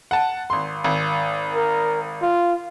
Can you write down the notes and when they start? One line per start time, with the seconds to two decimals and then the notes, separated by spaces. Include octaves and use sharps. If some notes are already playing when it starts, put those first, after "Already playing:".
0.11 F#5 A5
0.50 G#1 C6
0.84 G#1
1.54 A#4
2.22 F4